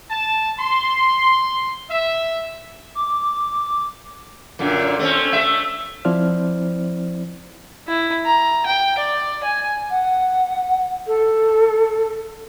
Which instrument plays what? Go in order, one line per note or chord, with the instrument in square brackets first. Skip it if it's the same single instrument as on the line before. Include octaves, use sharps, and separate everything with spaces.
[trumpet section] A5
C6
E5
[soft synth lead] D6
[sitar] F#2 A#2 D3
A3 C4 C#4
A3 E5
[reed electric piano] F3 C4 E4 C5 D5 F6
[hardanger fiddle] E4
A#5
G5
D5
G#5
[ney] F#5
A4